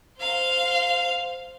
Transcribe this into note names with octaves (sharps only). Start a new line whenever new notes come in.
C5 F5